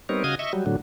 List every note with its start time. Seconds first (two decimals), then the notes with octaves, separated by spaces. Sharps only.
0.09 G3 B3 C4 D#4 A#4 C#5
0.24 C#3 F#4 D#5 F5 G#5 D#6
0.39 D#5 E5 C#6
0.53 F#3 G3
0.66 A2 D3 F#3